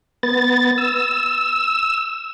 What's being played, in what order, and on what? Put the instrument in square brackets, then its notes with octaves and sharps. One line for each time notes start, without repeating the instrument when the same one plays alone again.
[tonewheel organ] B3 A6
E6